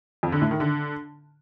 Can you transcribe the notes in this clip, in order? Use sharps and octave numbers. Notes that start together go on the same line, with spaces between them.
F2
D3
A2
D#3
D3